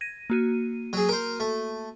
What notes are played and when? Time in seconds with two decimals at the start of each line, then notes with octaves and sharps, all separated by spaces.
0.01 G#6 A#6 D#7
0.30 A#3 F#4 D#7
0.93 F#3 G#4
1.09 A#4 C5
1.40 A3